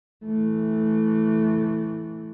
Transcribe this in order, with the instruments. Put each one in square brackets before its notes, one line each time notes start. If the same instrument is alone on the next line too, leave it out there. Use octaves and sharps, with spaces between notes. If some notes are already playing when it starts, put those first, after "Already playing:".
[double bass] E3 A3